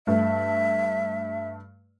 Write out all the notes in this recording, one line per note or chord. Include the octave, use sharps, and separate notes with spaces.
G2 A3 E5